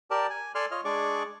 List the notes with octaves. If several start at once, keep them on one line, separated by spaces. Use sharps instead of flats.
G4 A#4 D5 A5
G#5
A4 D5 G#5 A5 C6 F6
F4 C#5 D#5 F6
G#3 D4 G#4 D5 C#6 D6